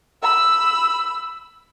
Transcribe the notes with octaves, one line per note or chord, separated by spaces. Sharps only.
B5 E6